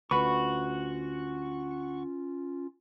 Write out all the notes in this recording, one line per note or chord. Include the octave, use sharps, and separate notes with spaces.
D2 C#4 F4 F#4 B4 C#6